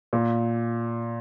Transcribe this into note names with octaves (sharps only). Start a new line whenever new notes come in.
A#2